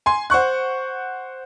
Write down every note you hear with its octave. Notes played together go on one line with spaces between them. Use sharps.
G#5 C6
C5 F#5 C#6 F#6